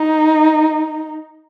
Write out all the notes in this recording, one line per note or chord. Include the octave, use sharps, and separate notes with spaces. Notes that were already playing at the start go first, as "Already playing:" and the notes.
Already playing: D#4